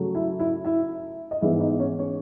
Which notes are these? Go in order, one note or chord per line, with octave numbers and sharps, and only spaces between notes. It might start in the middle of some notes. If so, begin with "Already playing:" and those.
Already playing: C#3 F#3 A3
E4 E5
E4 E5
E4 E5
D#5
G#2 E3 G#3 B3 E4 E5
D#4 D#5
C#4 C#5
C#4 C#5